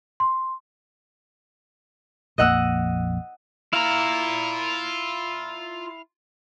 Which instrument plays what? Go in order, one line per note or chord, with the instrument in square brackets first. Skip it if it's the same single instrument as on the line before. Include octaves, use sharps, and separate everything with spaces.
[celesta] C6
[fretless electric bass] A#1 F2 A#3 [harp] D#5 F#5 E6
[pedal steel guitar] E4 F5 [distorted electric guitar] F4 A#5